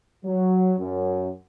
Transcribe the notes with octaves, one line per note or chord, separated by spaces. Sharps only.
F#3
F#2